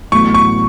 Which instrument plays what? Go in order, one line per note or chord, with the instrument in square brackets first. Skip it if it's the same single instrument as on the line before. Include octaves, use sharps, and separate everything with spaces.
[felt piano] A1 A2 F#3 B3 E4 [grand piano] C#6
[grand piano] C#6